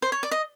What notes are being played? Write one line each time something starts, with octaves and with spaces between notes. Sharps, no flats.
C5
C#5
D5
D#5